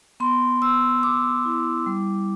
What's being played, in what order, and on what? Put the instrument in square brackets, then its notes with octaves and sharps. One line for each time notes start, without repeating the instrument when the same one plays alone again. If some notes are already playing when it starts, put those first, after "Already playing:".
[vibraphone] B3 C6
B3 E6
B3 D6
E4
G3